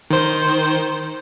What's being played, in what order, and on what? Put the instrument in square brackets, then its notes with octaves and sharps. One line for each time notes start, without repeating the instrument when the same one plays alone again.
[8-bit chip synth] D#3 C5